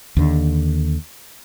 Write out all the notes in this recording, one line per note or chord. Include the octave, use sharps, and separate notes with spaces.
D#2 D3